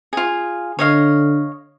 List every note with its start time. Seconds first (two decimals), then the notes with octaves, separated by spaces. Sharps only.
0.13 F4 G#4
0.79 D3 C#5 D#5 F5